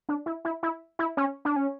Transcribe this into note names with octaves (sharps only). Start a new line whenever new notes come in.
D4
E4
E4
E4
E4
C#4
D4
C#4